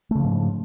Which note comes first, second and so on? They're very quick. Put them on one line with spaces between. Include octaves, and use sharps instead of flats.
A3 C#3 F3 G#2